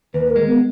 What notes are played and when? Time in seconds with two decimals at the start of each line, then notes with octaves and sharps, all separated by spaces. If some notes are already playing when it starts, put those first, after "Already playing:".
0.14 D#2 B4
0.25 B4
0.30 A#4
0.36 G#3
0.47 B3